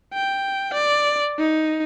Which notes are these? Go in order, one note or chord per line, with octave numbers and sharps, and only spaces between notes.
G5
D5
D#4